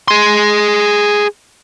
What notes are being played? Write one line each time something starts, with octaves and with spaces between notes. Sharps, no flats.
G#4 C6